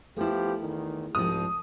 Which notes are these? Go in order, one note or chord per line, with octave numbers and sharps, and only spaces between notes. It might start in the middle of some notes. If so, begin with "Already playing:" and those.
F3 A3 B3 E4 G4
E2 D#3
C2 G#2 F3 D#6